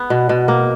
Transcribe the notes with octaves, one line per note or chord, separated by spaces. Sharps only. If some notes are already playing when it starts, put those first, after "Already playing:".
Already playing: B3
B2
B2
A#3